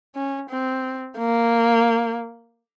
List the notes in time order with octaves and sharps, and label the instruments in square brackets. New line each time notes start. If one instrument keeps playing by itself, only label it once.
[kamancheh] C#4
C4
A#3